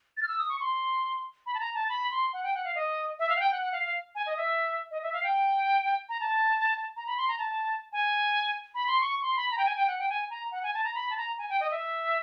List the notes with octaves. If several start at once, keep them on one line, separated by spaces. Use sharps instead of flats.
A6
F6
E6
D#6
C#6
C6
B5
A5
A#5
A5
B5
C6
F#5
G5
F#5
F5
D#5
E5
F5
F#5
G5
F#5
F#5
F5
F5
G#5
D#5
E5
D#5
E5
F5
G5
A#5
A5
A#5
B5
C6
A#5
A5
G#5
B5
C6
C#6
C6
B5
A#5
G5
G#5
G5
F#5
G5
G#5
A#5
F#5
G#5
A5
A#5
B5
A5
A#5
G#5
G5
D#5
E5